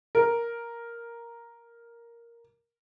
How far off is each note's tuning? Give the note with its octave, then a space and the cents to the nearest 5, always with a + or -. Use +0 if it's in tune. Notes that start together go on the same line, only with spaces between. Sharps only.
A#4 +5